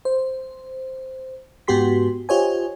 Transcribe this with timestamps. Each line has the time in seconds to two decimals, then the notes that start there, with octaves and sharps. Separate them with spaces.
0.05 C5
1.67 G#2 B3 F#4 G4 C6 B6
2.29 F4 G4 C5 C#5 D#5 G#5